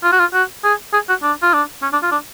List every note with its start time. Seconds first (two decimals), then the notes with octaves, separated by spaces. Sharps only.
0.04 F4
0.13 F#4
0.20 F4
0.34 F#4
0.64 G#4
0.93 G#4
1.09 F#4
1.23 D4
1.42 F4
1.53 D4
1.82 C#4
1.93 D4
2.03 F4
2.12 D4